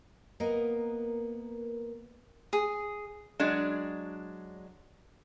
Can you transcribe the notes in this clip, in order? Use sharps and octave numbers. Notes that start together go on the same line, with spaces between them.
A#3 B3 A#4 D#5
G#4
F#3 G#3 D4